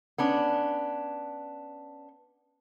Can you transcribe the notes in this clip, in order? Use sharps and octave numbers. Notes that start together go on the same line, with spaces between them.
B3 C#4 D4